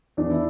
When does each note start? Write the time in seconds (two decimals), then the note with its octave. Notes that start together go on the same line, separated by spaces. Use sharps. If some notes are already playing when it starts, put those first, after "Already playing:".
0.17 E2 D4
0.30 E4